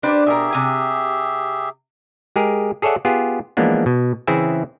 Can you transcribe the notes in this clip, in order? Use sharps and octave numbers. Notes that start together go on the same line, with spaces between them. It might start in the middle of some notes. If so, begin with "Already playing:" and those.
D4 G4 B4 C5
B2 G4 G#4 A#4 E5
C3 G#5
G#3 G4 G#4 A#4
G#4 A4 C#5 D5 E5 F#5
B3 F4 G4 G#4
E3 F3 G#3 A#3 B3 D4
B2
C#3 E3 C4 E4 G#4 E5